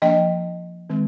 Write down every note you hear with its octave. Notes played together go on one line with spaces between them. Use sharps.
F3 A#3 D4 D#5 G5
D#3 G#3 C4